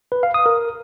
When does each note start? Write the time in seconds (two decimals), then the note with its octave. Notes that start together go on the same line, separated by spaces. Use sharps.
0.12 B4
0.23 F5
0.34 D#6
0.46 A#4